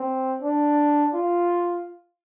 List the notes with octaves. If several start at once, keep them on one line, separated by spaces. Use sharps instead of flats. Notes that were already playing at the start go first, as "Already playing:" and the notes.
Already playing: C4
D4
F4